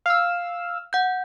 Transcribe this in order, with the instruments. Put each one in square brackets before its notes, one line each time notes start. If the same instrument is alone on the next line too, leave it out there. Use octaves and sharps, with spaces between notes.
[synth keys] F5 E6
[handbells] F#5 G6